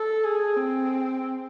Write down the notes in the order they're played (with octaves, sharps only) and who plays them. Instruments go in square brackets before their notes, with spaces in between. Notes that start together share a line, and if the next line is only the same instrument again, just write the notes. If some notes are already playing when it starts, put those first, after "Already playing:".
Already playing: [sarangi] A4
G#4
C4